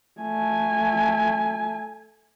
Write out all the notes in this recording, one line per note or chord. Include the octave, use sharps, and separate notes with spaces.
A3 G#5